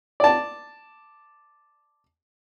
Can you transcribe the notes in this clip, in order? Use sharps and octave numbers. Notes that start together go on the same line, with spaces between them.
D5 A5